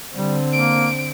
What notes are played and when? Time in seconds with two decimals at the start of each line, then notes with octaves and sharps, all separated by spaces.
0.15 D3 G3 C4
0.52 A#3 D7